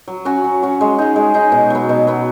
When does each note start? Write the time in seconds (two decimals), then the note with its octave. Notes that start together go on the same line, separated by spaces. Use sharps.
0.08 F#3
0.25 C#4 F#4
0.44 F#3
0.62 C#4 F#4
0.81 G#3
0.98 D#4 G#4
1.16 G#3
1.34 D#4 G#4
1.52 B2
1.70 F#3 B3
1.89 B2
2.07 F#3 B3